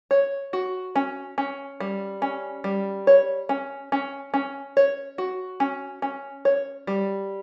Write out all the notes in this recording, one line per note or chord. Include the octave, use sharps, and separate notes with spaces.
C#5
F#4
C#4
C#4
G3
C#4
G3
C#5
C#4
C#4
C#4
C#5
F#4
C#4
C#4
C#5
G3